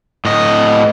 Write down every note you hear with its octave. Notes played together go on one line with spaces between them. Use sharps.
A2 D#5